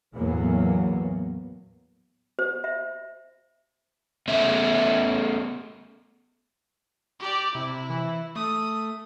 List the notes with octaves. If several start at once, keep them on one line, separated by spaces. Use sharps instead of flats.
E2 A2 E3 F#3 A#3 B3
C5
E5
A3 B3 C#4 E5
G4 D5
C3 E4
E3
A3 D#6